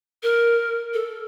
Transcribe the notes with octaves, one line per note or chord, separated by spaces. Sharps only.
A#4
A4